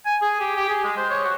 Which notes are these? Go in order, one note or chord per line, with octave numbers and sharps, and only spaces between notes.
G#5
G#4
G4
G4
G#4
G#3
C5
C#5
F#4